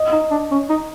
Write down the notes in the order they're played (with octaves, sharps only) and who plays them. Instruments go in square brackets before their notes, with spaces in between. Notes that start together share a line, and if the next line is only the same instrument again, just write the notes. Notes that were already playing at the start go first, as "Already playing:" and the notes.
Already playing: [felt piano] D#5
[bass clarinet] D#4
D4
C#4
D#4